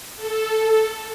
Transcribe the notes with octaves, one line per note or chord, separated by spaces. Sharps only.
A4